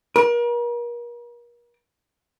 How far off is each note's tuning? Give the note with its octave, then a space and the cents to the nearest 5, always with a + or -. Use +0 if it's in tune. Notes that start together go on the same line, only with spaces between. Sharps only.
A#4 +40